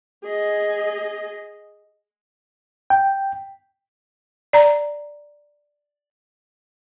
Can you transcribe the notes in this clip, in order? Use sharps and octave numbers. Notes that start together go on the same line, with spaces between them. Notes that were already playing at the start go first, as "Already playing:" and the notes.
G#4 D#5
G5
D5 A#5